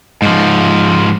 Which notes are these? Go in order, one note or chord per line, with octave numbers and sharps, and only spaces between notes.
G#2 F3